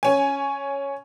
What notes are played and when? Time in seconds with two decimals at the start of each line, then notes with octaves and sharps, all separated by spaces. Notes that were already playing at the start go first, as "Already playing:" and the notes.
0.03 C#4 G#5